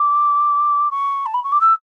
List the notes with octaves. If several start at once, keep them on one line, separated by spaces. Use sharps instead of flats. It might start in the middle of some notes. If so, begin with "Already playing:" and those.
Already playing: D6
C#6
A5
B5
C#6
D6
E6